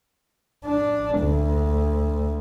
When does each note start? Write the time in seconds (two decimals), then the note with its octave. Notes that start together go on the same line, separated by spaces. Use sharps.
0.65 D4
1.20 D2